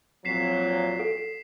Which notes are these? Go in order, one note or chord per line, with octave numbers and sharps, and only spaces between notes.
F2 A#2 F#3 B6 C7 E7
A4